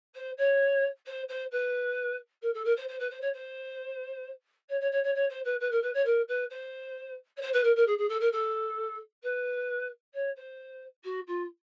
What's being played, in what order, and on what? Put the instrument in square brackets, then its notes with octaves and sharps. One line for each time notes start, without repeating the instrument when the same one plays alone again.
[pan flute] C5
C#5
C5
C5
B4
A#4
A4
A#4
C5
C5
B4
C5
C#5
C5
C#5
C#5
C#5
C#5
C#5
C5
B4
B4
A#4
B4
C#5
A#4
B4
C5
C#5
C5
B4
A#4
A#4
G#4
G#4
A4
A#4
A4
B4
C#5
C5
F#4
F4